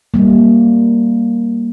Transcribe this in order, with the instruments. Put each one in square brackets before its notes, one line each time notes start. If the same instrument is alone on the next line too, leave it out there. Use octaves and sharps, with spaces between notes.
[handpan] G3 A#3